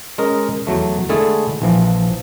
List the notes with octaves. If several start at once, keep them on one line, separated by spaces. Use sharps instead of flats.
G#3 C#4 A#4 D#5
E2 F#3 A3
D3 G#3 A3 E4 G#4 A4
A#1 E3 F3